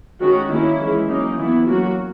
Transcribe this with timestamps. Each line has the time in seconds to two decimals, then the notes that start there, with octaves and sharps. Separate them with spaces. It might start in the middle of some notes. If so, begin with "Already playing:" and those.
0.20 D#3 G#3 C#4 F#4
0.49 D#3 A#3 C#4 E4
0.78 E3 G#3 C#4
1.08 F#3 A#3 C#4 D#4
1.37 E3 B3 E4
1.66 F#3 A#3 C#4 F#4